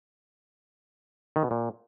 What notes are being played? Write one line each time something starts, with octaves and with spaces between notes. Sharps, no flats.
D#3
B2
A#2